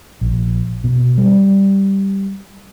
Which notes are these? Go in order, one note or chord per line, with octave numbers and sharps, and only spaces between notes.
A#1
B2
G3